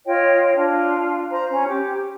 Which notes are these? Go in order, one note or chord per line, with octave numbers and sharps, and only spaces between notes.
F4 C#5 D#5 G5
D4 F4
C5 A#5
C#4
G4